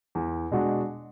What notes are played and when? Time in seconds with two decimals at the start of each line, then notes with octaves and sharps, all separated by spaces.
0.15 E2
0.51 B2 G#3 D4 F#4